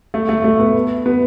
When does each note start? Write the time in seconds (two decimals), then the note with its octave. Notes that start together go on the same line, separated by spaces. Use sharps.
0.14 A3
0.29 A3
0.44 A3
0.59 B3
1.06 B3